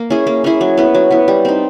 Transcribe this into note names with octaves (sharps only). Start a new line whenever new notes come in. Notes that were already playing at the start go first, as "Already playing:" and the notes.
Already playing: A#3
C#4 E4 G#4
A#3
C#4 E4 G#4
F#3
B3 E4
F#3
B3 E4
G3
C4 D#4